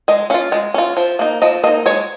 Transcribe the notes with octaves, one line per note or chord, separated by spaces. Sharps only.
G#3 D#5
C#4 F4 F5
G#3
C#4 F4
F3
A#3 D#4
F3 D#5
A#3 D#4 D#5
G#3 C#5